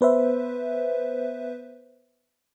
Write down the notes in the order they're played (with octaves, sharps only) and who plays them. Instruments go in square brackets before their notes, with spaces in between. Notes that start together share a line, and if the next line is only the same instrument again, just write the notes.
[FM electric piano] B3 B4 C5 E5